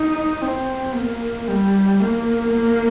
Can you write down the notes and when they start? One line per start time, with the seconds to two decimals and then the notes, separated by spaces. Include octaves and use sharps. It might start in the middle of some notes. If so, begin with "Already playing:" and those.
Already playing: D#4
0.41 C4
0.95 A#3
1.48 G3
2.01 A#3
2.54 A#3